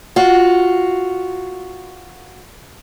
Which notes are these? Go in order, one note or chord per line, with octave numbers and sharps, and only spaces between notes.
F4 F#4